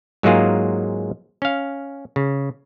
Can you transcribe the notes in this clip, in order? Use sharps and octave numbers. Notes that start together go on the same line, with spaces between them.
G#2 F#3 G#3 A#3 F4 G#4
C#4 F5
C#3